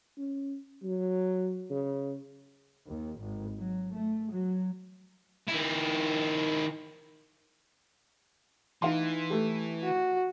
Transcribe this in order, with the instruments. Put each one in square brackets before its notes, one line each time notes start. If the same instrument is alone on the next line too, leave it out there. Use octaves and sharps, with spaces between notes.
[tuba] C#4
F#3
C#3
[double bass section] D#2
G#1
F#3
A3
F#3
[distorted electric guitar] D#3 E4
[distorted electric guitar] E3 [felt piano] D#4 F5 C6
[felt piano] A3 G4
[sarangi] F#4